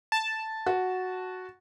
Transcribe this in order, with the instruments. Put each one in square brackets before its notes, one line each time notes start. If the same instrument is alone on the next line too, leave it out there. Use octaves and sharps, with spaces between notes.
[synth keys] A5
[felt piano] F#4